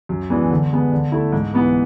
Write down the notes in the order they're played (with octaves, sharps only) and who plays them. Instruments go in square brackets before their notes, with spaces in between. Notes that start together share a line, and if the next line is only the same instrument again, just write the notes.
[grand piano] F#2
E3 G#3 B3 D4
D3
G#3 B3
D3
A3 E4
G#2
E3 B3